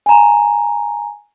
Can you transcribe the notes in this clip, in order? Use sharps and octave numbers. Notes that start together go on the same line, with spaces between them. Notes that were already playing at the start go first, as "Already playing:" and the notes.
G#5 A#5